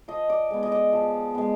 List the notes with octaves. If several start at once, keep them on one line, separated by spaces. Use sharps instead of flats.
F3 D#5
D5
G#3 B3
D#5
D5
F3
G#3 B3